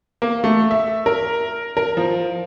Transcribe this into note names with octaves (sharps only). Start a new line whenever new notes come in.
A#3
A3
E5
A#4
A#4
F3